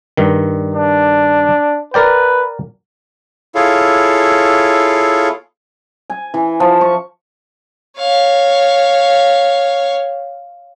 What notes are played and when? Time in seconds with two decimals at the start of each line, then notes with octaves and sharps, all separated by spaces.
0.17 G2 D#3
0.75 D4
1.94 A#4 B4 D5 G5
3.55 E4 F4 G#4 A4 C#5 F5
6.10 G#5
6.34 E3
6.60 F3
6.81 C#6
7.98 C#5 F5